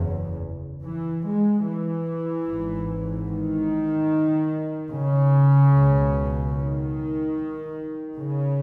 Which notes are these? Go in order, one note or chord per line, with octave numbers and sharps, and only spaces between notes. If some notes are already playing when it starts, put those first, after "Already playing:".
Already playing: F#1 E2 C#3
E3
G#3
E3
G#1 G#2
D#3
C#3
C#2 B2
D#3
C#3